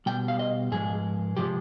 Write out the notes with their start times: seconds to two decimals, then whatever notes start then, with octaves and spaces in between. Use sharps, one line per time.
0.06 B2 G3 G5
0.28 F5
0.39 D#5
0.72 G#2 F3 G#3 G#4
1.37 C3 F3 G#3 G4